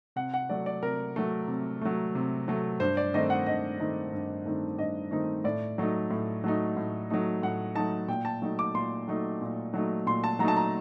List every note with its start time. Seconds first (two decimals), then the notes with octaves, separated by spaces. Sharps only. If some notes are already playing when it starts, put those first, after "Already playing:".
0.16 C3 F#5
0.34 F#5
0.49 F#3 A3 D5
0.66 D5
0.83 C3 A#4
1.16 F#3 A3
1.48 C3
1.82 F#3 A3
2.15 C3
2.48 F#3 A3
2.80 G2 C5
2.97 D5
3.14 D#3 A3 C4 D#4 D#5
3.30 F#5
3.46 G2 D#5
3.79 D#3 A3 C4 D#4
4.13 G2
4.45 D#3 A3 C4 D#4
4.78 G2 D#5
5.11 D#3 A3 C4 D#4
5.44 A2 D5
5.78 F#3 A3 D#4
6.11 A2
6.44 F#3 A3 D#4
6.77 A2
7.10 F#3 A3 D#4
7.42 A2 F#5
7.75 F#3 A3 D#4 A5
8.08 A#2 G5
8.25 A5
8.42 F#3 A3 D#4
8.59 D6
8.75 A#2 C6
9.08 F#3 A3 D#4
9.41 A#2
9.74 F#3 A3 D#4
10.06 A#2 C6
10.24 A5
10.39 F#3 A3 D#4 A#5
10.48 A5
10.57 A#5